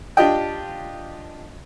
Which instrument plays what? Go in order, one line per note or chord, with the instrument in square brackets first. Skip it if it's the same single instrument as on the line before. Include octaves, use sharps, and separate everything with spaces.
[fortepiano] D4 F4 G4 D#5 G5